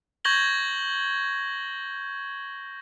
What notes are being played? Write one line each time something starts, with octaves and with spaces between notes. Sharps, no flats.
C#6 G6 G#6 A#6 F#7 G7